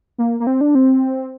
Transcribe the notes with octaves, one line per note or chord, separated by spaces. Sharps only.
A#3
A#3
C4
D4
C4